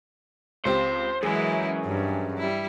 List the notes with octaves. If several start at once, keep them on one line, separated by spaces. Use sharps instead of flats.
C#2 C4 G4 C5
F#2 E3 G#3 E4 G#4
G2
G3 E4